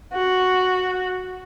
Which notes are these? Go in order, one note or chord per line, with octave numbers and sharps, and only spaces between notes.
F#4